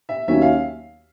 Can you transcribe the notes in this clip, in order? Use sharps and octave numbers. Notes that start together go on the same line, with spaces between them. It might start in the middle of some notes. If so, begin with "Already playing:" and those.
E5
D#2 D#3 F#3 A#3 C#4 E5
F5